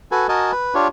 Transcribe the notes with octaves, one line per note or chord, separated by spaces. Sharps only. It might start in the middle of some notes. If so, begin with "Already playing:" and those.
F#4 A4 B4 G#5
F#4 A#4 D#5 G#5 A5
B4
D4 F4 G4 C#5